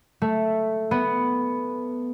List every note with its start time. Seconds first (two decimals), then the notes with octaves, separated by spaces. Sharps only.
0.22 A3
0.91 B3